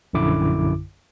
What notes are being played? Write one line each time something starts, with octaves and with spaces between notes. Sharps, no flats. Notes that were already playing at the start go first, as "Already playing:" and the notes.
A#1 F#2 D3 E4 D6